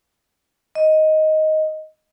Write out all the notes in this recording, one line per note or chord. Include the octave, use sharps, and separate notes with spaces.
D#5